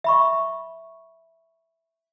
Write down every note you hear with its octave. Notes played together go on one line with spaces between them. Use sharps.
E5 B5 C#6